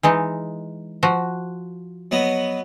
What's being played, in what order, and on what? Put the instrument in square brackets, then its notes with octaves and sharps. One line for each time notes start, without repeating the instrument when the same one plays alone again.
[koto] E3 G#3 D#4
F3 F#4
[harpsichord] F#3 B3 D#5